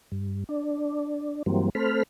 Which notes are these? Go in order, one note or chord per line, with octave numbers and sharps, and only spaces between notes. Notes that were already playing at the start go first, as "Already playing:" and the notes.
G2
D4
G2 E3 F#3 G3 A#3 C4
A3 C4 A4 C5 B5 F6